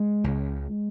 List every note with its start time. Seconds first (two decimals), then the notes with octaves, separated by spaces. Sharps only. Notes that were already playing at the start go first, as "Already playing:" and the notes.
Already playing: G#3
0.24 C#2 C#3